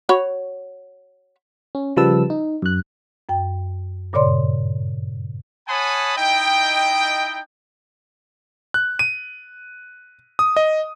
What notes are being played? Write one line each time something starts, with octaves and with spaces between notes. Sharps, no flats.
F#4 C#5 B5
C#4
C#3 F3 G3 B4 A5 E6
D#4
F#2 F#6
F#2 G5
G2 A#2 C#3 C#5 D5 C6
C#5 F#5 G#5 A5 B5 D#6
D#4 E4 D#5 G5
F#6
D#7
D#6
D#5